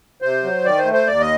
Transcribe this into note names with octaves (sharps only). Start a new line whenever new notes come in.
C3 C5
F#3
D#3 D5
C5
A3
C5
D#2 D5
D#5